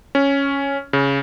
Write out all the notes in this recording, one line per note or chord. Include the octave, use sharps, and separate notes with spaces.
C#4
C#3